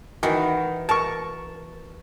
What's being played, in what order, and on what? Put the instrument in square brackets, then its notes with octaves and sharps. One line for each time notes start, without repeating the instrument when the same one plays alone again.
[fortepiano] D#3 [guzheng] E3 F#4
[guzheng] A#4 [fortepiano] A5 C#6